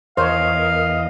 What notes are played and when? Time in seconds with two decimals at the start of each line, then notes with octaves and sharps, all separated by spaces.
0.17 E2 A#4 C5 C#5 D#5 F5